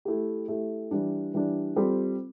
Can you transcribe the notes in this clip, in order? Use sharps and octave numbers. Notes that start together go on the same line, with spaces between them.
A3 E4 G4
A3 E4 G4
E3 G3 D4
E3 G3 D4
G3 C4 F4 A4